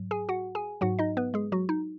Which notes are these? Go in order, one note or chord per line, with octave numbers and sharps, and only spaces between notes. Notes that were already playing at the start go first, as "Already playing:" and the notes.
Already playing: G#2 F#3
G#4 G#5
F#4 F#5
G#4 G#5
G#2 F#3 F#4 F#5
D#4 D#5
B3 B4
G#3 G#4
F#3 F#4
D#4